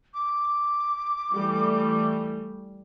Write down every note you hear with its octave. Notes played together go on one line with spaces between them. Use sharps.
D6
E3 G3 A3